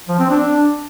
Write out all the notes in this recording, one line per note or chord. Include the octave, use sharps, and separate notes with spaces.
F3
C4
D4